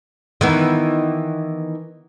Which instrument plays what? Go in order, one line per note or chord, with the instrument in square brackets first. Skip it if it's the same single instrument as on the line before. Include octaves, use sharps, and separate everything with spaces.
[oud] D#3 E3 B3